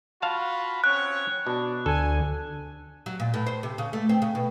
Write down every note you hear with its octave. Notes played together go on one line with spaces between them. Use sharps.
F4 F#4 F5 A5 B5
C4 C#4 C#5 F#6
B2 D4
D2 A4 G#5
F#3
A#2
A2
C5
C3
C#3
A3
C4
C#3
B2